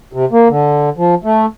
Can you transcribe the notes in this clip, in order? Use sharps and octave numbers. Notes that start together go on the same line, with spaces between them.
C3
A#3
D3
F3
A3